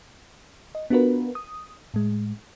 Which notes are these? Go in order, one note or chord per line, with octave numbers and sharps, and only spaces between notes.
D#5
B3 D4 F4 F#4 A#4 B4
D#6
A2 G#3